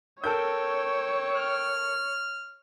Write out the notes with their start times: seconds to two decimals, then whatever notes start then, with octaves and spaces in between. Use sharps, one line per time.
0.24 A4 A#4 C#5 G5 E6 G6
1.37 F6